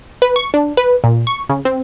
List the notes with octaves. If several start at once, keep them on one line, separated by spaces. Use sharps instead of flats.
B4
C#6
D4
B4
A#2
C#6
C#3
C4